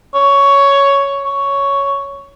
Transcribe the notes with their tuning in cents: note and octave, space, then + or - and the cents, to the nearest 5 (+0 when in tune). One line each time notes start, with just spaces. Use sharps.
C#5 +10
C#5 +5